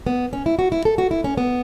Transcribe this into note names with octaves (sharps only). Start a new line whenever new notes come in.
B3
C#4
E4
F#4
E4
A4
F#4
E4
C#4
B3